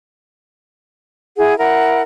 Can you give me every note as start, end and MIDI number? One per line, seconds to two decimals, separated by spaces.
1.37 1.56 64
1.37 1.56 68
1.37 1.56 78
1.58 2.02 64
1.58 2.02 70
1.58 2.02 78